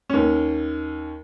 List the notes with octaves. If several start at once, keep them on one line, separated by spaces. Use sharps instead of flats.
D#2 C#4